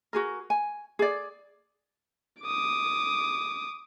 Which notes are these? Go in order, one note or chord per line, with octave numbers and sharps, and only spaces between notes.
F#4 G#4 A#4
G#5
G#4 D5
D6 D#6